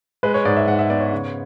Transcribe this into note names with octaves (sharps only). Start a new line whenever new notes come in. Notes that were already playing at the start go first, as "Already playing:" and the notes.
G#3 B4
C#5
G#2 D5
E5
G#2 F#5
E5
B3 D5
C#5
C#3